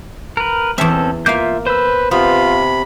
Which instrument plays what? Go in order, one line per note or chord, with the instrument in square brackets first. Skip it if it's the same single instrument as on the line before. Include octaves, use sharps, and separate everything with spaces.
[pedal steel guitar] A#4 B4
[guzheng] E2 E5 [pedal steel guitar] C4 C#4 A4
[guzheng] A#3 F5 [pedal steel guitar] F4 E5 G6
[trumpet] B4 [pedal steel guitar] C5 E6
[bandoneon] C3 B5 [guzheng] B3 [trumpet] F4